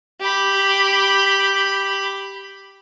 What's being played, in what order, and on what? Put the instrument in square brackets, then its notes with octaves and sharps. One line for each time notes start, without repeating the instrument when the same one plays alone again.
[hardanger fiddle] G4 B5